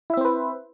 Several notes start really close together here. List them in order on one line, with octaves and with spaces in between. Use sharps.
E4 E5 C4 C5 B4